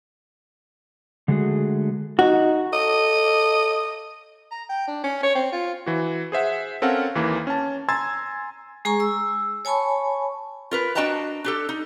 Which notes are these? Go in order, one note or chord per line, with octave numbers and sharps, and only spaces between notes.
D3 G#3 A3 F4 F#4 G#4
D#4 F#4
A4 D#5
A#5
G5
D4
C#4
C#5
C4
F4
E3 F#4
G#4 C5 E5 F#5
C4 C#4 A4 A#4 F5 F#5
D#2 E3 A#3
C#4 A5
G#5 A#5 C6 E6 G#6 A6
G#3 G#4 G#5 A#5 C#6
E6
C#5 G#5 A5 B5 C#6
F4 A#4 B4
D4 F#4 D#5 G5 A5 A#5
D4 G4 A4
D#4